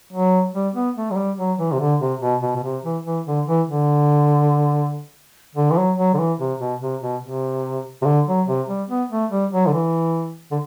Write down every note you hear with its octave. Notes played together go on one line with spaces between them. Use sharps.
F#3
G3
B3
A3
F#3
G3
F#3
E3
C3
D3
C3
B2
B2
B2
C3
E3
E3
D3
E3
D3
D3
E3
F#3
F#3
D3
E3
C3
B2
C3
B2
C3
C3
D3
F#3
C3
G3
B3
A3
G3
F#3
D3
E3
D3